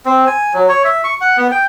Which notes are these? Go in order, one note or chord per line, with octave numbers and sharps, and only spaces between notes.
C4
G#5
F#3
C#5
E5
C#6
F#5
B3
G5